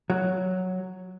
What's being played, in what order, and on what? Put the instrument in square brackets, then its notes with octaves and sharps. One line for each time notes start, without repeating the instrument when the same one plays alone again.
[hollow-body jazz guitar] F#3